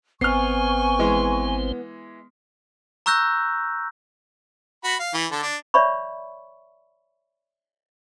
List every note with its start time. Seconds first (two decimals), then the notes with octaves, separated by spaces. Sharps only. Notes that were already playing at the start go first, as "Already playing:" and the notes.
0.21 G#1 B3 C4 C5 G#5 C#6 F6 C7
0.99 E3 G#3
3.06 A#5 C#6 E6 F#6 G6 A#6
4.84 F#4 B5
5.00 F5
5.14 E3
5.32 D3 A4
5.43 D4
5.74 C#5 D5 E5 B5 C#6